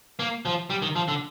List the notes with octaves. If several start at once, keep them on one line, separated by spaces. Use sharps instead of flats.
A#3
F3
G3
D#3
F3
D3